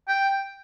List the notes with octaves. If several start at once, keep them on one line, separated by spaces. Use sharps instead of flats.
G5